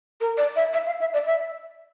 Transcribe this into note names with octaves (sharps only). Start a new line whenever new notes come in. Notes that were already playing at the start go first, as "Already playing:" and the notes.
A#4
D5
E5
E5
F5
E5
D5
E5